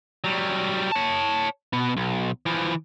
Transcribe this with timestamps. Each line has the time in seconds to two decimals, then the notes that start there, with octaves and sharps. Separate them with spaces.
0.24 F#3 G3
0.92 C#5 A5
1.73 B2 B3
1.97 B1
2.46 E3 F3